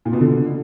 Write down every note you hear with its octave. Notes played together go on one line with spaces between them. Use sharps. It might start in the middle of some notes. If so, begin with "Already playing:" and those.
A#2
B2
D3